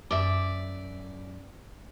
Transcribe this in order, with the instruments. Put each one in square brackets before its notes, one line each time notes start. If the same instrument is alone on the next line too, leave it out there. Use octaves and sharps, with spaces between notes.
[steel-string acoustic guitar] F#2 [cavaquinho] D5 E5